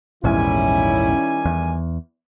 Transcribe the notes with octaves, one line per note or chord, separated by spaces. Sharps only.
A#1 E2 G#2 D#3 G3 C#4 E4 G#5
E2